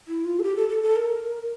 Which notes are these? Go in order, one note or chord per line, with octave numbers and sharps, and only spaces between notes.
E4
F4
A4
G4
A4
A4
A4
A#4